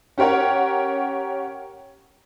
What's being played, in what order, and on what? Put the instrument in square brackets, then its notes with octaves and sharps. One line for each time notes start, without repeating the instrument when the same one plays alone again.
[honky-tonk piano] C#4 G4 A#4 C#5 F#5